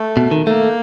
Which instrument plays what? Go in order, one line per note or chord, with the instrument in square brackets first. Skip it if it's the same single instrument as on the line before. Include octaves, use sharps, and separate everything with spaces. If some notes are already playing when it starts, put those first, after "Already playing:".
Already playing: [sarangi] A3
[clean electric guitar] B2
D#3
[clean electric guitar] A3 [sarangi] A#3